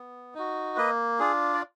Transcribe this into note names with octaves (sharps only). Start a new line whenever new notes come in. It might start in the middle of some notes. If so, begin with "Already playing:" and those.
Already playing: B3
D#4 F#4
A#3 B4 D#5
D4 F4 G#4
D5